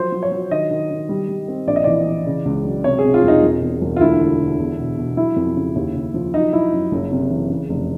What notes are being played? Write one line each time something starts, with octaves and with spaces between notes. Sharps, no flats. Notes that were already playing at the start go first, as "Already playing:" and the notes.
Already playing: F3 F#3 C5
F#3
C#5
F#3
D#3 D#5
D#3
D#3
G3
G3
C4
A#1 D5
D#5
E3 D5
E3
C#3
C#2
F#3
C3 C#5
G#4
C3
F4
E1 D#4
E1
E2
E1
F4
D2 E4
D3
D3
E2
B2
B2
F#3 E4
F2
C#3
D#2
C#3
F3
F#3 D#4
F#3 E4
F#2
F#1
C3
E3
C#3
F1